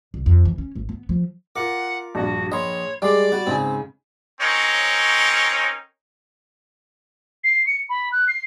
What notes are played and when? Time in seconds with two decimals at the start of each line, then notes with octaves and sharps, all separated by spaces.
0.14 C2
0.26 F2
0.45 E3
0.58 C#4
0.75 G#1
0.89 B3
1.09 F3
1.56 F4 A#4 F#5 D6
2.15 A#1 G2 F#4
2.52 A#1 C#5 D#5 B5 C6
3.02 G3 G#3 D5 C6 D6
3.32 G3 F#4
3.47 G#2 C#3 C4 G#5
4.41 C4 C#4 D#4 A#4 C#5
7.44 C7
7.67 C#7
7.89 B5
8.12 F#6
8.28 C7